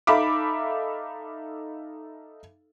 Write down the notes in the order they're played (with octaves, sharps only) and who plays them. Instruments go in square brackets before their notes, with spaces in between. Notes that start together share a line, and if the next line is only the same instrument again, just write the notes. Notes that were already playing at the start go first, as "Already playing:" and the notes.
[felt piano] D#4 A4 E5 F5 B5 D6